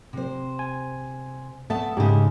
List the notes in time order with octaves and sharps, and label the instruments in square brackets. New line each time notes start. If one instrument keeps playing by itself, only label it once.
[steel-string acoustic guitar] C3 C5
[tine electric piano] G#5
[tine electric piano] A3 [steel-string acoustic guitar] B3 E5 A5
[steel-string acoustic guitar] G#2 C#3 [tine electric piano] G#3 D#4 G4